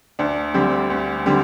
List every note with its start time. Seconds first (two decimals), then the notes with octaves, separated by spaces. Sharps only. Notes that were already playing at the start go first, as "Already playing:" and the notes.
0.19 D2 D4
0.54 D3 G3 C4
0.90 D2
1.26 D3 G3 C4